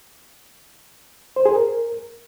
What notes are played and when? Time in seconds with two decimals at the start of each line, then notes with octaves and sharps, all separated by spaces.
1.36 C5
1.46 G#4
1.55 A#4